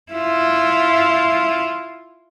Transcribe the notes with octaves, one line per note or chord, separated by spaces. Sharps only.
E4 F4